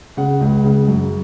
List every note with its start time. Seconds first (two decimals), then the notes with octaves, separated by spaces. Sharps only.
0.17 C#3 F#5
0.41 C#2
0.64 C#3
0.88 F#2